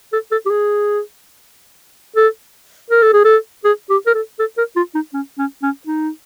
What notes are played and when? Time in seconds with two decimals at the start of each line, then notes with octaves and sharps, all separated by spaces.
0.12 A4
0.31 A4
0.45 G4
0.50 G#4
2.16 A4
2.90 A#4
3.02 A4
3.13 G#4
3.24 A4
3.64 G#4
3.89 G4
4.06 A#4
4.14 A4
4.39 A4
4.57 A#4
4.76 F4
4.94 D#4
5.13 C#4
5.38 C#4
5.62 C#4
5.87 D#4